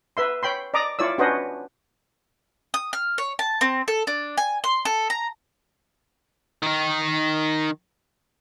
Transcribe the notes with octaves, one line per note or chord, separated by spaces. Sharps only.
B4 E5 C6
C#5 G5 B5 C6
D5 D#5 A#5 D6 D#6
E4 F4 C#5 D5 E6
C#4 D4 F#4 B4 C5 D#5
D#6
F6
C#5
A5
C4
A4
D4
G#5
C6
A4
A#5
D#3 D#4